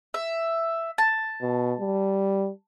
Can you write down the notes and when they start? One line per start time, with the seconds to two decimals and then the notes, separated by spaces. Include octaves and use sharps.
0.14 E5
0.98 A5
1.42 B2
1.80 G3